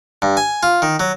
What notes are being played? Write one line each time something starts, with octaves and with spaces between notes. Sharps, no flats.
G2
G#5
F4
D#3
F#3